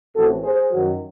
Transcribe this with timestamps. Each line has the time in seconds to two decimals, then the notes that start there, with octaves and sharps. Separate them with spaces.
0.15 A1 A2 E3 C4 F#4 A4
0.43 G#4 C5
0.71 F#2 D#3 F#3